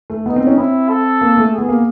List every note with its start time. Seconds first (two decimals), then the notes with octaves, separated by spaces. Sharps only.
0.10 A3
0.26 B3 D#4
0.36 C4
0.47 C#4
0.58 C4 E4
0.89 A4
1.21 A#3
1.37 A3
1.54 B3 G#4
1.69 A#3